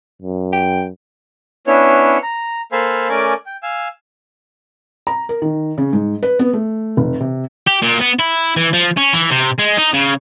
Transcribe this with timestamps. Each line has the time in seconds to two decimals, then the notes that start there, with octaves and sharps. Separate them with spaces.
0.22 F#2
0.53 G5
1.67 B3 C#4 D4 E4 C#5
2.23 A#5
2.72 A#3 A4 C5 F5 G#5 B5
3.09 A3 C#4 A#4 D5 G#5 D6
3.46 G5
3.63 F5 G#5 E6
5.07 A#5
5.29 A#4
5.42 D#3
5.78 C#3
5.93 G#2
6.23 B4
6.39 B3
6.53 A3
6.97 F1
7.20 C3
7.67 G4
7.82 A#2
8.00 B3
8.19 E4
8.57 E3
8.73 F3
8.97 C#4
9.13 E3
9.31 C3
9.59 G#3
9.78 D#4
9.94 C#3